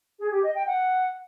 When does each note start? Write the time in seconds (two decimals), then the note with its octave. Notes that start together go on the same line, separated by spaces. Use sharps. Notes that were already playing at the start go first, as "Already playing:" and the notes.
0.19 G#4
0.31 G4
0.43 D#5
0.54 G5
0.66 F#5